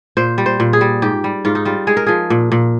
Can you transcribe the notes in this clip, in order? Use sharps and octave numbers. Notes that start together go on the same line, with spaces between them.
A#2 C5
G3
C5
A#2
G#4
G3
G#2 G4
G3
G#2 F4
D#4
G3 F4
G#3 G#4
A#4
F3 G#4
A#2
A#2